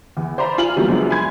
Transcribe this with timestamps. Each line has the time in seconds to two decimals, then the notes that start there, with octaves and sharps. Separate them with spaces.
0.17 E2
0.38 C5 D5 E5 A#5 B5
0.58 F4 G#5 F7 F#7
0.76 E3 F#3 G3 A#3 B3
0.88 F#2 F3 G#3 B3 D4
1.10 G#5 B5 C6 G#6